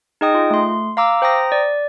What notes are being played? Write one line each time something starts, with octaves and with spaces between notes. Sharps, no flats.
D#4 G#4 D#5 G5 D#6
F4
A3 C6
F5 A#5 D6 E6
C5 G5 A#5 D#6 A#6
D5